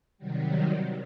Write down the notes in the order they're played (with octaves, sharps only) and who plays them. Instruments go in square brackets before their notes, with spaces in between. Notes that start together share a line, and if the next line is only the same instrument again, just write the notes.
[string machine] C3 D#3 F#3 G3